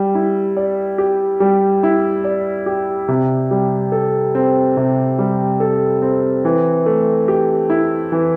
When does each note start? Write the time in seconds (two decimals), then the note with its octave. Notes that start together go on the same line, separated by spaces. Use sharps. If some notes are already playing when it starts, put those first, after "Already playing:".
Already playing: G3
0.15 E4
0.57 D5
0.98 G4
1.40 G3
1.83 E4
2.24 D5
2.66 G4
3.08 C3
3.51 G3
3.92 A4
4.35 C4
4.77 C3
5.19 G3
5.60 A4
6.02 C4
6.45 E3
6.86 A3
7.28 G4
7.70 E4
8.12 E3